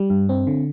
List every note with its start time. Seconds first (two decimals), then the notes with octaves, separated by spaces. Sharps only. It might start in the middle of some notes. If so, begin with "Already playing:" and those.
Already playing: G3
0.10 G2
0.29 C4
0.47 D3